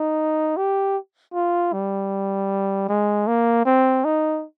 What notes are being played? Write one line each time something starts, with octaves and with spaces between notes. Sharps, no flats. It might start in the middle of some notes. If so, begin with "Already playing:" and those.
Already playing: D#4
G4
F4
G3
G#3
A#3
C4
D#4